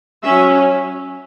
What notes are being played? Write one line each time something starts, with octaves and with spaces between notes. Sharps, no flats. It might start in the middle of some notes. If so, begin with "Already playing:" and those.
F#3 C#4 E5